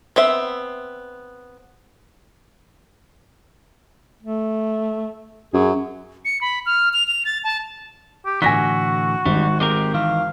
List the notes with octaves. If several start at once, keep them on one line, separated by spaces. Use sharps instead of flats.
B3 C4 E5
A3
F#2 G#4
C#7
B5
F6
F7
F7
A6
A5
G4
A2 D3 E3 F#4 G#5 A#6 B6
G#1 G3
G#3 C4 G4 A#4
D#3 E3 F5